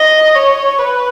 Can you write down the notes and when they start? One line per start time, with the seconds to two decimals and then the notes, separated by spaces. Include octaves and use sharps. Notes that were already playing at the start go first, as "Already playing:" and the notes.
Already playing: D#5
0.35 C#5
0.79 B4